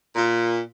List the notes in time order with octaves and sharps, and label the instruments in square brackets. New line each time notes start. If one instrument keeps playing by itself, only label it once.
[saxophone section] A#2